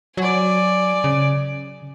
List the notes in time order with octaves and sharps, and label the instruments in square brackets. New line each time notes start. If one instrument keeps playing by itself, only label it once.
[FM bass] F#3 [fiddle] D5 G#5
[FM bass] C#3